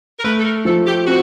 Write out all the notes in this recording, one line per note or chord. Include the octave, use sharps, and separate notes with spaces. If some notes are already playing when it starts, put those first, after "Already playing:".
A#4
A3 B4
A4
A#4
F3 A4
G4
C4 F#4